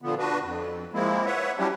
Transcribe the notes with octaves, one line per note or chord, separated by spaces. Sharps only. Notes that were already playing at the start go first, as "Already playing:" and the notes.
A#2 D3 F3 B3
D4 F#4 B4
F2
F3 G#3 A#3 C4 E4
B4 C#5 E5 F#5
F#3 G3 C#4 D4 E4 G4